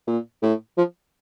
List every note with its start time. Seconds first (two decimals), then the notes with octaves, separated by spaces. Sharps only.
0.07 A#2
0.42 A2
0.77 F3